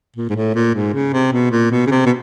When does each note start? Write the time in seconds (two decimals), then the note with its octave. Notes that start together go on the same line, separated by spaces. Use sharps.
0.16 A#2
0.30 G#2
0.36 A2
0.55 A#2
0.75 G#2
0.94 C#3
1.13 C3
1.33 B2
1.51 A#2
1.71 B2
1.86 C#3
1.91 C3
2.06 B2